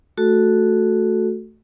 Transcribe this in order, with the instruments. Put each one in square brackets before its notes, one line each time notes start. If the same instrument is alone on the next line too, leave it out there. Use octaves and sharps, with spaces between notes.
[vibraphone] A3 F#4 A4